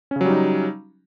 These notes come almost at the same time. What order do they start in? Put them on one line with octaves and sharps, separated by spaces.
C#4 C#3 F#3 G3 D#4